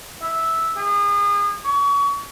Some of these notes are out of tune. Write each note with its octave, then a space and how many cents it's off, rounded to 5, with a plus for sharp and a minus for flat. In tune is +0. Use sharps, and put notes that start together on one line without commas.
E5 -10
G#4 -35
C#6 +35